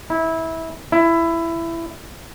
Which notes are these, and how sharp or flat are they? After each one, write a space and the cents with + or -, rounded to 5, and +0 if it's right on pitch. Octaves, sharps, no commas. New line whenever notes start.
E4 -20
E4 +15